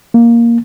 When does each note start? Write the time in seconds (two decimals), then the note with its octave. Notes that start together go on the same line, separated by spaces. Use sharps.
0.14 A#3